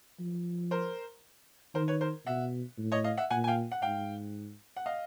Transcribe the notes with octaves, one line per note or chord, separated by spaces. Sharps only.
F3
A#4 C5
D#3 A#4 C5
B4 C#5
A#4 C5
B2 E5 F#5
A2
C#5 D#5
D#5 F5
E5 F#5
A#2 F#5 G#5
G#5
F5 G5
F#5
G#2 F5 G5
F#5
D#5 F5